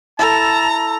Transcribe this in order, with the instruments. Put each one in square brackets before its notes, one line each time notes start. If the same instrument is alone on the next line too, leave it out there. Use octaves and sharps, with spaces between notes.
[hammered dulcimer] E4 A4 [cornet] A5 [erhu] A#5